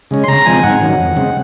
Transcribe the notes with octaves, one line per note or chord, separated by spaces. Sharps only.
C#3 G#3 C#4
C6
C#3 A#5
F3 G#3 C4 G#5
G#2 F#5
D#3 F#3 C#4
F2
C#3 G#3 C4